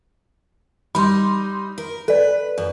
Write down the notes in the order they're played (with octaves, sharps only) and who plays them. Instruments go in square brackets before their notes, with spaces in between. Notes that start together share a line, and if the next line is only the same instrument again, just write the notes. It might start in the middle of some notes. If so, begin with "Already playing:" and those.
[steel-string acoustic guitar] G3 D#4 [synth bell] B5 C6
[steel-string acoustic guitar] A#4
[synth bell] A4 D5 [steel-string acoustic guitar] B4
[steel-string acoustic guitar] F#2